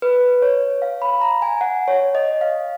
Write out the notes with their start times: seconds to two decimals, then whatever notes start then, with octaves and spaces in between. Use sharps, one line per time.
0.02 B4
0.42 C#5
0.82 F5
1.02 B5
1.21 A#5
1.42 G#5
1.61 F#5
1.88 C#5
2.15 D#5
2.41 F5